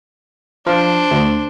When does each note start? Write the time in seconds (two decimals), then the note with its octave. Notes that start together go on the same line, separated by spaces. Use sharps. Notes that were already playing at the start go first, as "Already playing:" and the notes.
0.66 F3 D4 C5
1.11 D2